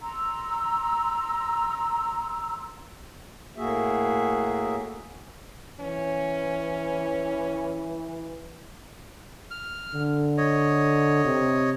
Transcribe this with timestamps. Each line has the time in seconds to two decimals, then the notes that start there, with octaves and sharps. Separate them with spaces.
0.01 A#5 C6 E6
3.57 A2 A#3 F#4 G#4 E5
5.80 E3 C#4
9.51 F6
9.94 D3
10.38 C#5 D#5
11.24 C3